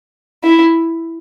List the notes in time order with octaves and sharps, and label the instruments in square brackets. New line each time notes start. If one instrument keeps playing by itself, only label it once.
[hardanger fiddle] E4